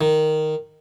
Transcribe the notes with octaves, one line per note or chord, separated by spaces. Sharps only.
D#3